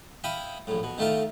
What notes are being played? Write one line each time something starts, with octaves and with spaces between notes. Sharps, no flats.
E4 F5 G5 B5 D#6
A#1 A2
B2
D#3 A3 F4 A#4